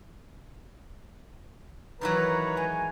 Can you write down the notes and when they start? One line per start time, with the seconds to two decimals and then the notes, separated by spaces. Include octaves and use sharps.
2.01 D#3 E3 F#3 B4 C#5 A#5
2.57 G#3 G#5